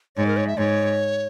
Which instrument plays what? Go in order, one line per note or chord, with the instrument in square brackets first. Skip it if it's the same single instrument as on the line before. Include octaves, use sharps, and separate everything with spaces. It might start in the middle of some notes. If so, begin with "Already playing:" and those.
[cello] G#2 [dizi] C#5
[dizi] A#4
C#5
E5
[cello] G#2 [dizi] C#5